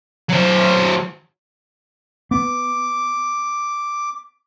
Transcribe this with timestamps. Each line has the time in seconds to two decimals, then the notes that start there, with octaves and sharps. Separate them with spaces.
0.29 F#3 C5
2.31 B3 D6